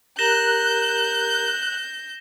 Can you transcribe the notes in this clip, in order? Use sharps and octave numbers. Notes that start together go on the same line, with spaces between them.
G4 A#4 A#5 F#6 G6 A#6 E7 G7